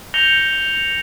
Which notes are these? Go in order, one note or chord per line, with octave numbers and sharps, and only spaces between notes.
G6 A#6 C#7 F7 G7